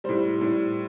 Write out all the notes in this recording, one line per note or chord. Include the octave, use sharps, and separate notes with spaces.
A2 G3 C5
A2 G3